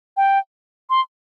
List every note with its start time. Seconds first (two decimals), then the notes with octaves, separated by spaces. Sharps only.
0.17 G5
0.90 C6